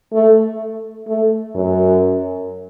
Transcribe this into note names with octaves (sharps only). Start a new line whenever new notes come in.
A3
A3
F#2